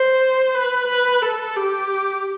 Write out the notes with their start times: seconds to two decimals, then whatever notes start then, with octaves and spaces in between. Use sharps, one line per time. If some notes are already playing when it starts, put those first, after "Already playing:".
Already playing: C5
0.55 B4
0.88 B4
1.22 A4
1.56 G4